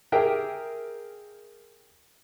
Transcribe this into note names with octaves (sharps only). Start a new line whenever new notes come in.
G4 G#4 A#4 E5 G5